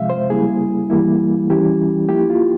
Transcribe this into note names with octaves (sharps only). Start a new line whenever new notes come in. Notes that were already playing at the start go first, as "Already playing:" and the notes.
Already playing: C3 F3 G#3 E5 F5
C5
C#3 G3 A#3 E4 G#4
E3 G3 A#3 E4
E3 G3 C#4 E4 G4
F3 A#3 E4 G4
F4